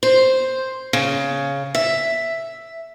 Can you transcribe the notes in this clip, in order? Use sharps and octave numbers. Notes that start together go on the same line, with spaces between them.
C5
C#3
E5